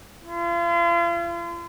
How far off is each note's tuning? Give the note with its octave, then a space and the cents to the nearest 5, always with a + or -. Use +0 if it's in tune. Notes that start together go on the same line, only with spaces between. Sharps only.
F4 -40